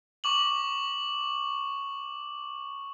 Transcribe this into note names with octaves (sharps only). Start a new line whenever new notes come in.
C#6 D6 F#7